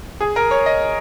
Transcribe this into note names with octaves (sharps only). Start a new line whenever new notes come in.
G#4
A#4
C#5
D#5